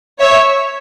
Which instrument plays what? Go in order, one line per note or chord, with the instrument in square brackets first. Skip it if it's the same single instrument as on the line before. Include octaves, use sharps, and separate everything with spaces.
[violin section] C#5 E5